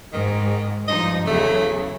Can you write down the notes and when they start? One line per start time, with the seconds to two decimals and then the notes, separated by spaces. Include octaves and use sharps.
0.13 G#2 D#3
0.88 G2 F3 D#4 D#5
1.27 E2 C#3 F#3 A3